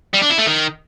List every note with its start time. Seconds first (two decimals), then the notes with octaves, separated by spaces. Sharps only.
0.13 G3
0.22 D4
0.30 E4
0.38 A3
0.46 D#3